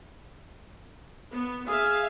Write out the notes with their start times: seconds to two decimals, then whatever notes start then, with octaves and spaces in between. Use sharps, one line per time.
1.32 B3
1.68 G#4 E5 F5